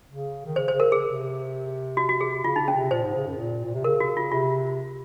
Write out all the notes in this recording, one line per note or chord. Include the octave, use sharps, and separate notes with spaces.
C#3
D#3
C#3 C5
C5
C#3
A#4
G#4
C3
F#4
F#4
G#4
C#3 F4
D#4
C#3
C#4
C3
A#2 C5
G#2
C#3
F#2
A#2
A#2
C3
C#3 A#4
F#4
F4
C3 F4